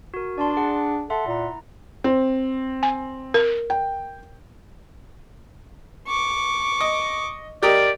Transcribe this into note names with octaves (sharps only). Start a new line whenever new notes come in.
F#4 A#4
D4 D5 A5 C6
G#4 F#5
A4 E5 F#5 C6
A#2 E4 A#5
C4
G#5
A#4
G5
C#6 D6
D#5
G4 A#4 D5 D#5